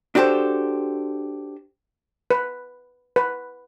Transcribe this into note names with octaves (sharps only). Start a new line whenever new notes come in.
D4 F#4 G4 A4 C5
B4
B4